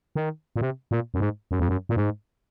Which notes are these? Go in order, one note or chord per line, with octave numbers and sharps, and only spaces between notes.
D#3
A#2
C3
A#2
F#2
G#2
F#2
F2
F#2
A#2
G#2